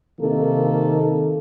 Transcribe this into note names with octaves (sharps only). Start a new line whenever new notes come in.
C3 D#3 A#3 A4